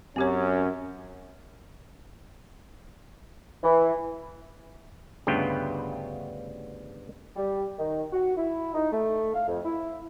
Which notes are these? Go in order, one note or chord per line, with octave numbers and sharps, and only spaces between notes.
F#2 C4 C#4 G4 C#5
E3
D2 G2 C#3 B3 F4 G5
G3
D#3
F#4
E4
D#4
A3
F5
F2
E4